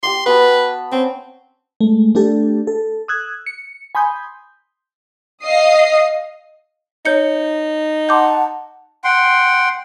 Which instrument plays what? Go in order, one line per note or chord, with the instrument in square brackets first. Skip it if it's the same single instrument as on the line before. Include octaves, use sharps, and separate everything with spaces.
[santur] G4 G5 D6 [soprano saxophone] C6
[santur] B3 F#4 A5 [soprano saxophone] B4
[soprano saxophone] C4 [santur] C#4
[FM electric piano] G#3 A3
A3 D4 G4 A4
A4
D#6 E6 F#6 G#6
C#7
G#5 B5 C6 D#6 G6
[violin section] D#5 F5 D#6 C7
[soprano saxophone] D#4 [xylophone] C#5 G6 C#7
[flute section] F#5 A5 [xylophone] C6 D6 G6
[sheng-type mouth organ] F#5 G5 C6